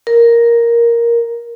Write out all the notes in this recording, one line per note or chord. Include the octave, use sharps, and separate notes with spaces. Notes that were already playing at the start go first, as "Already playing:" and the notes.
A#4